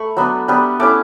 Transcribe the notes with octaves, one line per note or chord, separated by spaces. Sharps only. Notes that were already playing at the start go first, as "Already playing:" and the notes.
Already playing: A3 B5 C#6
F#3 B3 D4
G3 B3 D4
A3 C#4 E4 D6